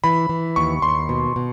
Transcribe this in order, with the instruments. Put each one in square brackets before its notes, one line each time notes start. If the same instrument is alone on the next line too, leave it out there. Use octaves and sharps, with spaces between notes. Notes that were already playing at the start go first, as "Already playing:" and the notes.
[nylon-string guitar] E3 [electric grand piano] B5
[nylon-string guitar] E3
[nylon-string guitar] D#2 [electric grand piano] C#6
[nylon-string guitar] D#2 [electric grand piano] C6
[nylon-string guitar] B2
B2